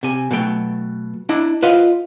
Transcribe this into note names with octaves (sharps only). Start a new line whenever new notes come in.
C3 G#5
B2 F#3 A3 G5
D4 E4 D#5
F4 B4 C5 D#5 F5 F#5